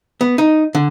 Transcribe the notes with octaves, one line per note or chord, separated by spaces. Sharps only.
B3
D#4
D3